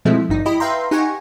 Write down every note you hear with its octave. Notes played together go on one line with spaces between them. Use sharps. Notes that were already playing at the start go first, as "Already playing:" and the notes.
B2 F3 G#3 A3 C4 E4
G#1 G2 D#4
E4 G4 D#5 B5
B4 E5 F5 G5 A#5 C6
D#4 G4 F#5 G#5 C#6